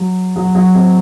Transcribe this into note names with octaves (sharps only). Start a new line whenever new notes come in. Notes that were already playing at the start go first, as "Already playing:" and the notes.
Already playing: F#3
F#3
F#3
C4